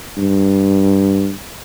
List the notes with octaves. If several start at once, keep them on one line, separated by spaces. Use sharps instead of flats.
G2